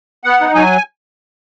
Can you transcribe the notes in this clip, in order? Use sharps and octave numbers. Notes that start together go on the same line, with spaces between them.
B3 F#5
D#4
F#3 G#5